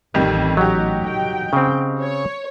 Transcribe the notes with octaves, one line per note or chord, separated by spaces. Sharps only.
A1 F2 D#3 G3
F#3 D#4 F#4 G4
G5
C#3 C4
C#5